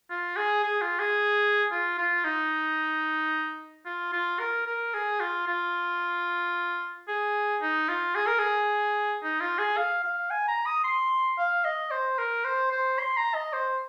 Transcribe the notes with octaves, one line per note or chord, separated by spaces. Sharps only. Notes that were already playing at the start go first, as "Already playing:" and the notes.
F4
G#4
G#4
F4
G#4
F4
F4
D#4
F4
F4
A#4
A#4
G#4
F4
F4
G#4
D#4
F4
G#4
A#4
G#4
D#4
F4
G#4
F5
F5
G#5
A#5
D#6
C6
F5
D#5
C5
A#4
C5
C5
C6
A#5
D#5
C5